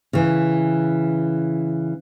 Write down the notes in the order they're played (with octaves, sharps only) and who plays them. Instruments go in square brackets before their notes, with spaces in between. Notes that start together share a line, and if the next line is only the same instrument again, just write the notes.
[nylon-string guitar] C#3 E3